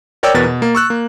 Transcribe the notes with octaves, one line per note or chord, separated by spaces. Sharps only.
A#4 C#5 D5 G5 D6 E6
E2 B2 A#4 B4 A6
B2
A#3
C#6 E6 F#6
A#3